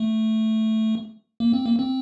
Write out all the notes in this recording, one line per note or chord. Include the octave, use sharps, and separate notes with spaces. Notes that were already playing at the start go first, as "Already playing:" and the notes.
Already playing: A3
A#3
C4
A#3
C4